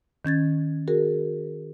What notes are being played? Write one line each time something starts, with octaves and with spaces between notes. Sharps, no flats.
D#3 C#4 G#6 A6
F#4 G#4 A#4